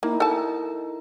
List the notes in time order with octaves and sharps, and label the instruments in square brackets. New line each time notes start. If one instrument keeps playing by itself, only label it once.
[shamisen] A#3 [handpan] D#4 E4 A#4
[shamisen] A4 A5